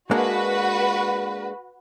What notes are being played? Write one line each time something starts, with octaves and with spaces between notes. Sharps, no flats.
G#3 A#3 D4 F#4 B4